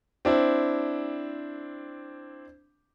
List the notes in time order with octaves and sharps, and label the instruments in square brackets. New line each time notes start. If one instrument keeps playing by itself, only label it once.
[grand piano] C4 D4 E4